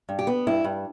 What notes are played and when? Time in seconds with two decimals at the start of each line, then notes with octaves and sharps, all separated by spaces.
0.09 G2
0.19 G4
0.27 B3
0.47 G2 E4
0.64 G2